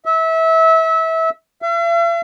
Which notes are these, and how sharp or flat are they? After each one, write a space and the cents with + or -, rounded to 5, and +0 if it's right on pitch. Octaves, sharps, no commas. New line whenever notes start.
E5 -25
E5 +45